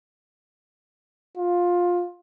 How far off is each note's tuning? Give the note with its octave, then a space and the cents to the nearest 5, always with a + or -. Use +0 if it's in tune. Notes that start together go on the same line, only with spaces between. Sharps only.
F4 +15